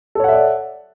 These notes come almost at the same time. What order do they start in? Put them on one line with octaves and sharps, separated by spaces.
A4 C#5 F#5 E5 D5